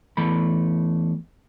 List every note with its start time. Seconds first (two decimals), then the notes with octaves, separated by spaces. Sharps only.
0.17 E2 E3 A3 B5